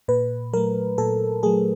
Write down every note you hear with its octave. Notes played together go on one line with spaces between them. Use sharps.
A#2 B4
F#3 A3 A#4
A#2 A4
F#3 A3 G#4